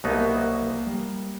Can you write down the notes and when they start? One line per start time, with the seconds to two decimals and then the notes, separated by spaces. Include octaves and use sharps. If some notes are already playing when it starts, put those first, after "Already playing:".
0.04 C2 B2 F#3 A#3 B3 D#4
0.86 G3